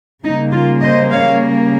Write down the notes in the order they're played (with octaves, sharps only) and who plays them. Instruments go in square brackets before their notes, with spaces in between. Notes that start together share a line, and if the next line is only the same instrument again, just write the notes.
[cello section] C#3 G3 A#3 D#4
F4
C5 D#5
C#5 F5